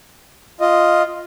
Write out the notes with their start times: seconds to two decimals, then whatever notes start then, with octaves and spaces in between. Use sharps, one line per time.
0.60 F4 D#5